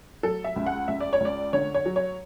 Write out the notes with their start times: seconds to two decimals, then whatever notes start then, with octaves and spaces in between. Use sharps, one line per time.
0.23 F#3 A4
0.44 E5
0.56 C#2
0.66 F#5
0.88 C#2 E5
1.00 D5
1.13 C#5
1.20 C#2 D5
1.53 D3 C#5
1.74 C#5
1.86 F#3
1.96 C#5